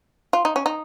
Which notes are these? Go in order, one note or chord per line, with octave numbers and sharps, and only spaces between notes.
F4
D#4
C#4
D#4